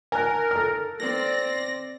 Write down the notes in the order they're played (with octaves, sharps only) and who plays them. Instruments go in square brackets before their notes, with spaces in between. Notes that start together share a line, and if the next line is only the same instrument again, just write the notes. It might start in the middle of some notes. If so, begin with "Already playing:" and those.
[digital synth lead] A#4 [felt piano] G#5 A5 F#6
[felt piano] A4 F6
[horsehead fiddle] C4 D5 [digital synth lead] A#6